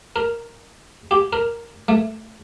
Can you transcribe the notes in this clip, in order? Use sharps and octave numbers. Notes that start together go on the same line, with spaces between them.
A#4
G4
A#4
A3